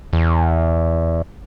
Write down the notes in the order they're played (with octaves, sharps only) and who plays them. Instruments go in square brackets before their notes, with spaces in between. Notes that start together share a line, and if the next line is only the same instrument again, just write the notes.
[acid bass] E2